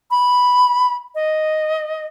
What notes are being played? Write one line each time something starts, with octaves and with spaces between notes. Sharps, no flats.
B5
D#5